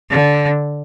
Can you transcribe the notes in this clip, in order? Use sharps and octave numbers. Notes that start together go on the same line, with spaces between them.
D3